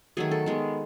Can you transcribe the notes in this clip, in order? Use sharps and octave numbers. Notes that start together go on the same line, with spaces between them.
D#3 F#3 A3 G#4
A4
D#3 G#3 B3